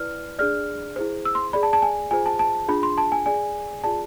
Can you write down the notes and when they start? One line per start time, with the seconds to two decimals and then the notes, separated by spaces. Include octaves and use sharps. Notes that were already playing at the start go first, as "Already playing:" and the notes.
Already playing: E4 B4 D5 F6
0.39 D4 G#4 D5 F6
0.96 E4 G#4 C5
1.25 E6
1.35 C6
1.53 G#4 D5 B5
1.63 A5
1.73 A5
1.82 G#5
2.11 F4 G#4 C5 G#5
2.26 A5
2.39 A5
2.68 D4 F4 G#4 B5
2.83 C6
2.98 A5
3.12 G#5
3.26 G#4 D5 G#5
3.84 F4 G#4 D5 A5